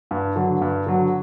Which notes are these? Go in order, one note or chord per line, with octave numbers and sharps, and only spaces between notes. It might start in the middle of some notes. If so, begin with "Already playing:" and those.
G2
D3 F#3
G2
D3 F#3